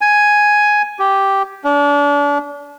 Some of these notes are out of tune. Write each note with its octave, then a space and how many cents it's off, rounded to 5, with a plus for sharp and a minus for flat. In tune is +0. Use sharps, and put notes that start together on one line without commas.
G#5 +5
G4 -5
D4 -35